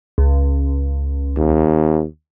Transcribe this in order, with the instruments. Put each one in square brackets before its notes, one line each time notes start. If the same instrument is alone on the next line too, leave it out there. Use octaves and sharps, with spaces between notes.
[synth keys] C#2
[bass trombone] D#2